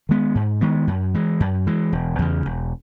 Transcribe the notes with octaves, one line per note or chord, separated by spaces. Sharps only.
D#3 G#3 B3
G#2
D#3 G#3 B3
F#2
E3 G#3
F#2
E3 G#3
E1
E2 C#3
E1